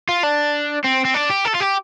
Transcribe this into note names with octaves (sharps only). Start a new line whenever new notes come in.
F4
D4
C4
C4
D4
G4
A4
F4
G4